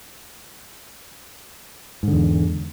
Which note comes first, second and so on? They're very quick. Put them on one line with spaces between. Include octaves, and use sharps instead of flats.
G#2 D3 E2